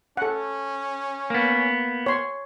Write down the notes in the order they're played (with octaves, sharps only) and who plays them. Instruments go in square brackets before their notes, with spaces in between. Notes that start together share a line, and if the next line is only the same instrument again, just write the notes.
[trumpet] C#4 [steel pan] A4 F#5
[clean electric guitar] A#3 B3
[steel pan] C#5 C6